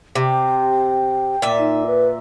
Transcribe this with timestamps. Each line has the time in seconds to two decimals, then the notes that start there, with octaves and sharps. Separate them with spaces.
0.15 C3 G5
1.42 A#2 E5
1.58 D#4
1.86 B4